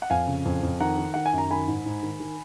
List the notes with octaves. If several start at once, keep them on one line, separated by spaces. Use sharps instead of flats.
F#5
F2 F5 G#5
C#3
F2
F2
D#3 F#5 A#5
D#3
D#3 F#5
G#5
F#2 A#5
D#3 G#5 B5
G#2
G#2
D#3
D#3